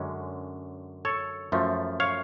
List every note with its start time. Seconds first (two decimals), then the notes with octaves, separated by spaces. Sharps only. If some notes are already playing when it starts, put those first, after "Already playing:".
Already playing: F#2 D3 G#3 C#4
1.05 A4 C#5
1.52 F#2 F3 A3
2.00 C#5 F5